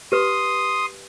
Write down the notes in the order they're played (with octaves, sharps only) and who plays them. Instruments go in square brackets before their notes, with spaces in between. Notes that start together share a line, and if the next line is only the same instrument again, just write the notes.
[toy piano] G4 B4 [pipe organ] C6 D#6